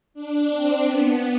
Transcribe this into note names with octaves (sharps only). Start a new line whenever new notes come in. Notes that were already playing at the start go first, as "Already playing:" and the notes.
D4
C4
B3